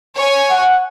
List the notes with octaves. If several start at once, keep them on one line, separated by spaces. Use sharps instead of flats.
C#5 G#5
F#5